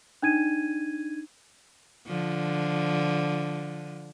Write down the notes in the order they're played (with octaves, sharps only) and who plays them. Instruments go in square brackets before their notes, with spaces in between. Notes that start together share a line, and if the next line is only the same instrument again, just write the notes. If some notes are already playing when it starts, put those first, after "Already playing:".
[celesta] D4 D#4 G#6 D#7
[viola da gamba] D3 F3